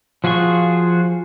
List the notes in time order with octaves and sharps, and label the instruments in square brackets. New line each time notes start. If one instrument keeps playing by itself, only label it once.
[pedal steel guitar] F3 F4 F#4 G#4 C#6